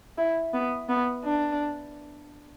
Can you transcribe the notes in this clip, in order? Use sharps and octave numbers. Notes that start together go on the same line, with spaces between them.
E4
B3
B3
D4